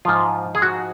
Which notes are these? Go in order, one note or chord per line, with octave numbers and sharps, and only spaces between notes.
G#2 F3 F4
G#4
F#4